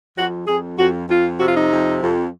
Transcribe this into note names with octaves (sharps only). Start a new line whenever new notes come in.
F2 F#4
F2 G#4
F2 F#4
F2 F4
C3 F#4
F4
D#4
F2
F2